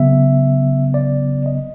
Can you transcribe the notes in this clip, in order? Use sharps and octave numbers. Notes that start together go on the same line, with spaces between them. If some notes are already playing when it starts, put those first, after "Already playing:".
Already playing: C#3 F#3 B3 E5
D5
D#5